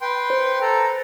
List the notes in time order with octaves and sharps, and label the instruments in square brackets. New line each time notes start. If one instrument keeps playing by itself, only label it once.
[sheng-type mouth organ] B4 G5 C6
[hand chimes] C5
[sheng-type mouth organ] A4 A#5